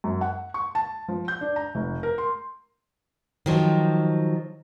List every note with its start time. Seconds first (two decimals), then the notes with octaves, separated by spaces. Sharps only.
0.04 F#2
0.21 F#5
0.54 C#6
0.75 A5
1.08 F3
1.28 G6
1.41 D4
1.56 A#5
1.75 F1
2.03 A#4
2.18 C6
3.46 D#3 F3 F#3